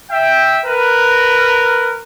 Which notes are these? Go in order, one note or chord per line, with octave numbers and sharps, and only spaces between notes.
E5 G5
A#4 B4